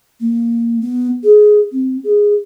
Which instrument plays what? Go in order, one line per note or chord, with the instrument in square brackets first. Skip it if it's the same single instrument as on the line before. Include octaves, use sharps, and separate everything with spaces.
[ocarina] A#3
B3
G#4
C4
G#4